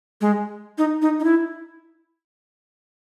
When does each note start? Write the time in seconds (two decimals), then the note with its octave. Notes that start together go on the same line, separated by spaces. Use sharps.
0.21 G#3
0.78 D#4
1.02 D#4
1.20 D#4
1.24 E4